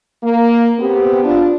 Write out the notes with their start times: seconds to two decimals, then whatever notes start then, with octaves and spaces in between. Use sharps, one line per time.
0.23 A#3
0.79 B3 C4 G4
1.23 D4 F4